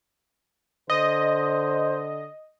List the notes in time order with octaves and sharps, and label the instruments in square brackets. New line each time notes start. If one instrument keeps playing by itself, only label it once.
[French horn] D3 [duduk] C5 [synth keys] D#5